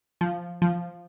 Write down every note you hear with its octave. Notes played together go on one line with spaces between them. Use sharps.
F3
F3